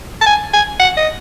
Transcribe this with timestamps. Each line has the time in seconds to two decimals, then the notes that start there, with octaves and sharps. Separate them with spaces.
0.21 A5
0.26 G#5
0.53 G#5
0.80 F#5
0.97 D#5